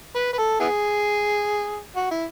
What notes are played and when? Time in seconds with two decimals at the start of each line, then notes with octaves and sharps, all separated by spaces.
0.15 B4
0.33 B4
0.38 A4
0.60 B3 E4 G#4
1.96 F#4
2.11 E4